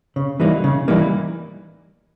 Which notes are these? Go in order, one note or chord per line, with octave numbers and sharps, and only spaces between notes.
C#3
E3 G3 A#3 D#4
C#3
E3 G3 A#3 D#4